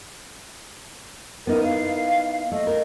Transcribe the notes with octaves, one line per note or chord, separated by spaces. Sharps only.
B3 D#4 E4 A#4
F5
A3 D#5
A#4